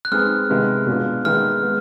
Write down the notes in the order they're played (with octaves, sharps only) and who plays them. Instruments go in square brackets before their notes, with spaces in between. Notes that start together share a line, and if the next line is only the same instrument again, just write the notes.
[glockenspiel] F#6
[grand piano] G#3 C4 D#4 G#4 B4 [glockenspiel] F6
[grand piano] C3 D#3 G#3 B3 E4
B2 G#3 B3 D4 F4
[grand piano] D#3 G#3 B3 E4 G#4 [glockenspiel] F6
[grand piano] G#3 B3